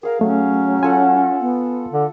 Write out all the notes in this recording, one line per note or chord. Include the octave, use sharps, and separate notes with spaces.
G#4 A#4 F5
F#3 A3 C#4
F4 A4 F#5 G#5
B3
D3